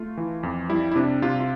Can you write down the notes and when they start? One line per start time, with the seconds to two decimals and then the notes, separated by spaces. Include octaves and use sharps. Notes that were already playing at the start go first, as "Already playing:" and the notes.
Already playing: A3 F4
0.17 E3
0.43 F2
0.69 G3 E4
0.92 E4
0.96 C3 D4
1.22 C3 F4
1.40 F4